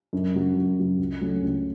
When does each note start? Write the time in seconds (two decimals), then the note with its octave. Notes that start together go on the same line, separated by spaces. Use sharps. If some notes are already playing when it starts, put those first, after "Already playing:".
0.13 F#2
0.34 C#3 F#3
0.56 F#2
0.77 C#3 F#3
0.99 C#2
1.21 C#3 F#3 A3 C#4
1.42 C#2